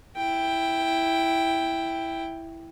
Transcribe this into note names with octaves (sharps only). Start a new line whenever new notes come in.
E4 G5